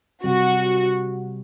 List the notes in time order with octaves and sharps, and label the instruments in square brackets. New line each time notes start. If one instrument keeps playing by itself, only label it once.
[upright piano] C3 G3 C4 [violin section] F#4